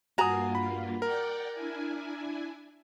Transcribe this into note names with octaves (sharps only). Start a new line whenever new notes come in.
G2 A#3 F4 F#4 G#5 A#5 D#6
B5
A#4 D5 F#5 G5
D4 E4 G#5